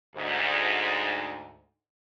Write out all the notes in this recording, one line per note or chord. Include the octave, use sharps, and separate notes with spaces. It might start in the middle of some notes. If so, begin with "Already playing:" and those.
D2 G#2